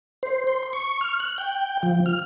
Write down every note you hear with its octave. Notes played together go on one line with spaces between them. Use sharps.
C5
C6
C#6
F6
F#6
G5
F3
F6